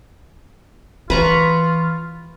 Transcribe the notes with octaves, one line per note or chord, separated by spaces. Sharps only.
E3 F4 B4 A#5 C#6